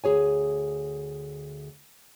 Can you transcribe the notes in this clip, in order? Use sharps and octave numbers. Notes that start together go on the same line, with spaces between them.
D2 G#4 C#5 G#5